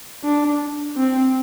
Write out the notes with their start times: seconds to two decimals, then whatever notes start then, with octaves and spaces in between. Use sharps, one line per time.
0.24 D4
0.97 C4